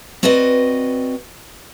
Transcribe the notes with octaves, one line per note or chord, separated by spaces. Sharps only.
C4 F#4 B4 D5 D#5